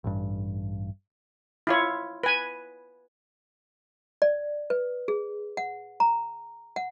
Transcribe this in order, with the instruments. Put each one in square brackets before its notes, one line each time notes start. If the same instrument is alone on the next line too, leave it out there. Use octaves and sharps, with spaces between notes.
[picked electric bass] A1 G2
[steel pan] E4 F4 C#5
B4 G#5
[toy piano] D5
B4
G#4
F#5
A#5
F#5